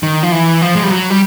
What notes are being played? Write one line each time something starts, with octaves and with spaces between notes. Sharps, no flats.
D#3
F3
E3
F3
G#3
G3
F#3
G3